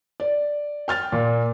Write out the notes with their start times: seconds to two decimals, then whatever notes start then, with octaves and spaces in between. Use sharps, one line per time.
0.20 D5
0.88 G5 F6 A6
1.12 A#2